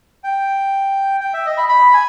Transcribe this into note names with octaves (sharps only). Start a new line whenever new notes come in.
G5
G5
E5
D#5
B5
B5
G#5